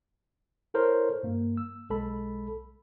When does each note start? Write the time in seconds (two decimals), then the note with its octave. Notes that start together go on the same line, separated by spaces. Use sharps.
0.74 E4 A4 A#4 C5 C#5
1.23 G2 A#3
1.57 E6
1.90 B1 G#3 A4 B5